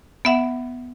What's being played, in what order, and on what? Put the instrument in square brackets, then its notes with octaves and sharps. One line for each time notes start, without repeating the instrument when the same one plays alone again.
[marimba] B3 E5 F#5